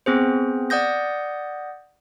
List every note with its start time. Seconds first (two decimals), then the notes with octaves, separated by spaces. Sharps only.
0.06 B3 C4 G#4 C5
0.70 D5 F#5 D#6 G6 A#6